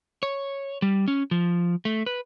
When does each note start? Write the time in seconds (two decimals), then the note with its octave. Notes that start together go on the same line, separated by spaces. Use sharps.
0.23 C#5
0.82 G3
1.08 C#4
1.31 F3
1.85 A3
2.06 B4